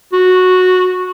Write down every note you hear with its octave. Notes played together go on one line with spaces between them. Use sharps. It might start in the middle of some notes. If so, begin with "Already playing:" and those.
F#4